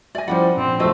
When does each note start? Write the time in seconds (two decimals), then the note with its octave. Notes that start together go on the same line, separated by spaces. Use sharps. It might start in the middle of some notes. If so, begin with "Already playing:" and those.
0.15 D5 E5 G#5 A#6
0.28 F3 G3 C#4 D#4 E4 C5 F#5
0.56 A#1 C4
0.80 B1 F3 A3 C5 D#5